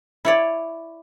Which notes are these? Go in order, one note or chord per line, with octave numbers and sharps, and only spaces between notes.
E4 C#5 D5